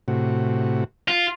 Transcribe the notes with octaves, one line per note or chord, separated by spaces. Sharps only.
A2 C3 F#4
F4